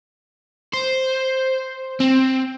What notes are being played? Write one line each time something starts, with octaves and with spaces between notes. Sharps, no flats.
C5
C4